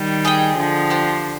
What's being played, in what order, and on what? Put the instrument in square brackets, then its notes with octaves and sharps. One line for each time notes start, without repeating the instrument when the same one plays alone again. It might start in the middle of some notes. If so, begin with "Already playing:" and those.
Already playing: [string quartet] D#3 G3
[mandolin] G#4 D#5 G5
[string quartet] D3 F3
[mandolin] D4 G4 C5